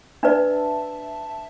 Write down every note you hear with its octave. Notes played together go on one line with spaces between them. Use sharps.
D4 B4 D5 E5 A5